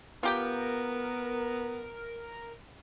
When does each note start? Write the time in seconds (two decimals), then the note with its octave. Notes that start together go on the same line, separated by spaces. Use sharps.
0.23 B3 F4 G4 A#4 G5